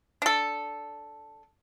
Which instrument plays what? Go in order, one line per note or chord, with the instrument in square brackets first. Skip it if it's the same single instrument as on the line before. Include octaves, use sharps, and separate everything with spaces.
[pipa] D4 A4